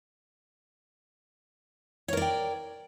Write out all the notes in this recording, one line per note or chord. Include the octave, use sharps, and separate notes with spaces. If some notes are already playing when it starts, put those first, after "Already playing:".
A#4 C#5 D5 G5